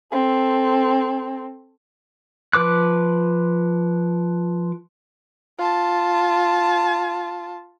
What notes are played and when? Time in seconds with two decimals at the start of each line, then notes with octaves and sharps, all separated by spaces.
0.12 C4 A4
2.53 F3 B4 D6 F#6
5.58 F4 A5